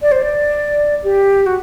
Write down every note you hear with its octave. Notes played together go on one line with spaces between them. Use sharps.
D5
C5
D5
G4
F#4